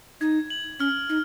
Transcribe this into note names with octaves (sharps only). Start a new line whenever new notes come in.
D#4 G#6
F#7
C#4 F6
D#4